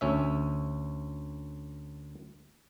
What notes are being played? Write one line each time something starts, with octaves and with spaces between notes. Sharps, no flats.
D2 C#4 E5